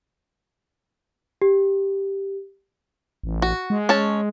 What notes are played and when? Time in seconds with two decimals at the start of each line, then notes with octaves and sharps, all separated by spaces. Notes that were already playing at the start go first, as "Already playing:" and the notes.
1.42 G4
3.24 A1
3.42 F#4
3.70 G#3
3.89 C#4 C#5 A5